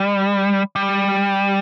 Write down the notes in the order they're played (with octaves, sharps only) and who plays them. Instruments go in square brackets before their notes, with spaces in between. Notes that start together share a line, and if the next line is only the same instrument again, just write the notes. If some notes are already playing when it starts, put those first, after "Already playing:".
Already playing: [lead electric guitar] G3
G3